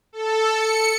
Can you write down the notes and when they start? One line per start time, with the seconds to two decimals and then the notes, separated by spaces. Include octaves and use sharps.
0.13 A4
0.50 C#7